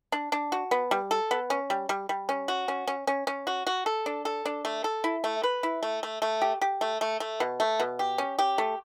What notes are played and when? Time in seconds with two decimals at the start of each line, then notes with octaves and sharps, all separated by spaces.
0.12 D4
0.32 D4
0.52 F#4
0.71 B3
0.91 G3
1.11 A4
1.31 B3
1.50 C#4
1.70 G3
1.89 G3
2.09 G3
2.29 C#4
2.48 F#4
2.68 C#4
2.88 C#4
3.07 C#4
3.27 C#4
3.47 F#4
3.67 F#4
3.86 A4
4.06 D4
4.25 A4
4.46 D4
4.65 A3
4.84 A4
5.04 E4
5.24 A3
5.43 B4
5.63 E4
5.83 A3
6.03 A3
6.22 A3
6.42 G4
6.61 G4
6.81 A3
7.01 A3
7.20 A3
7.40 B2
7.60 A3
7.80 B2
7.99 G4
8.18 C#4
8.39 G4
8.58 A3